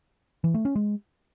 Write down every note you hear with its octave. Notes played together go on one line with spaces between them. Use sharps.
E3
A3
C#4
G#3